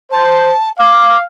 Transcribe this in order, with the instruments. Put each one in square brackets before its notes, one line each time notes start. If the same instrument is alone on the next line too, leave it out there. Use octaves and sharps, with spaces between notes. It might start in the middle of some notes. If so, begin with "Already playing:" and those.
[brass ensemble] C5 [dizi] A5
[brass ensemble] F5 [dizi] D6